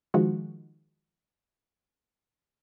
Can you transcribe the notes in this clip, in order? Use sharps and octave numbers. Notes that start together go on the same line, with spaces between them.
D#3 F3 G#3 F#4